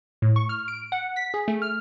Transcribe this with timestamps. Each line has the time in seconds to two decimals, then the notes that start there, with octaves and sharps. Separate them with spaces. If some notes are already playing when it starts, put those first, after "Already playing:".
0.22 A2
0.36 C#6
0.49 F6
0.68 D7
0.92 F#5
1.16 B6
1.34 G#4
1.48 A3
1.62 F6